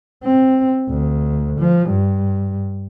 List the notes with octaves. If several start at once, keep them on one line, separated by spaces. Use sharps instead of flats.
C4
D2
F3
G2